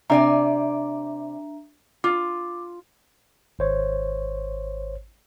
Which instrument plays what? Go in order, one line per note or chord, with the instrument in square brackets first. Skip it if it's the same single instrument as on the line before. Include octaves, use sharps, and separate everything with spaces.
[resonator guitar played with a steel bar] C3 D5 G#5 [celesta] D4 E5 A#5
[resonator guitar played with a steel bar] F4 [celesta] D6
[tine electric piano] G#1 C5 C#5